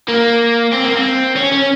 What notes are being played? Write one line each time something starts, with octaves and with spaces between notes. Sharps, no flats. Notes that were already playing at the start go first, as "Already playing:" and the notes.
A#3
C4
A#3
C4
C#4
C#4